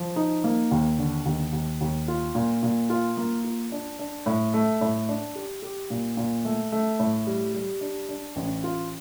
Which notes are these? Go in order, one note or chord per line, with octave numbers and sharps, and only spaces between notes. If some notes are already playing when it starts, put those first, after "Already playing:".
Already playing: F3
D#4
A#3
D#2
D3
D#2
D#2
D#2
F4
A#2
A#2
F4
A#3
F4
D4
D4
A2
A3
A2
D4
G4
G4
A#2
A#2
A3
A3
A2
G3
G3
D4
D4
A1
F4